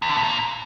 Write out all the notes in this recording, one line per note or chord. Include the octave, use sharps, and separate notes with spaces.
E2
D3
A2
A#2